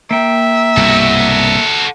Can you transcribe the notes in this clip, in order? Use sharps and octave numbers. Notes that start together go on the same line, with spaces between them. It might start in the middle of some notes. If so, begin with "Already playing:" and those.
A#3 E5 G5
C2 G2 B2 F#4 A4